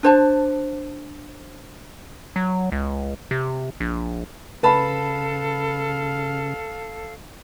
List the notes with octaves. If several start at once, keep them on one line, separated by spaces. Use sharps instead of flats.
D4 C5 A5
F#3
C#2
C3
A#1
C#3 A4 B4 F5 A5 B5